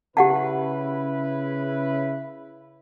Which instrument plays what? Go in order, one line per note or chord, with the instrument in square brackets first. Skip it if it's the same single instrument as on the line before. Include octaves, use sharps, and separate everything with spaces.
[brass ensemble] C#3 E4 B4 [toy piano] G4 F#5 A5